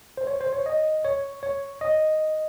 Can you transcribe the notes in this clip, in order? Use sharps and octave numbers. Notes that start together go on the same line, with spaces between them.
C5
C#5
C5
C#5
D#5
C#5
C#5
D#5